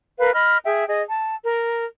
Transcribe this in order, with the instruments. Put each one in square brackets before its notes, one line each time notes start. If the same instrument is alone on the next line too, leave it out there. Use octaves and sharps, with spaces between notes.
[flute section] A#4 B4 F5
D#5 B5 F6
G#4 E5 G5
G#4 D#5
A5
A#4